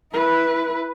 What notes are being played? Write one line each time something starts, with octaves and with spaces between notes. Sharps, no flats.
E4 B4